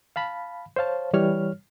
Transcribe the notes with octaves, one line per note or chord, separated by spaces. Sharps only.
F5 A5 B5
C5 C#5 F5 A5
E3 G3 C#5 F6